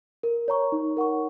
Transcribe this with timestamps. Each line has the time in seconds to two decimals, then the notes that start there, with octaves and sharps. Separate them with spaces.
0.23 A#4
0.48 C#5 A#5 C#6
0.72 D#4
0.97 A#4 F#5 C#6